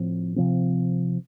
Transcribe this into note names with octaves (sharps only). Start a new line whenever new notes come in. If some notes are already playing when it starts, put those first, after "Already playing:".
Already playing: A2 F3 C4
C3 F3 C4